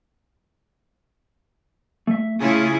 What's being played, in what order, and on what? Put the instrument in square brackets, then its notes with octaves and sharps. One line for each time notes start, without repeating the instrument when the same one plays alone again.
[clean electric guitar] A3 E5
[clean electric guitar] A2 A3 [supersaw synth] C#3 F4 G#4 [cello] C#4 E4